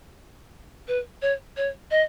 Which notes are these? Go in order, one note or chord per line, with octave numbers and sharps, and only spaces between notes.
B4
C#5
C#5
D#5